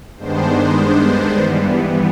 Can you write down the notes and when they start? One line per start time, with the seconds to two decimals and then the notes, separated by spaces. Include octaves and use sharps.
0.17 G2 D#3 G#3 B3 D4 C5
1.40 G2 E3 G3 B3